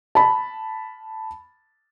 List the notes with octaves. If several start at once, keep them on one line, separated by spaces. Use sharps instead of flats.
A5 B5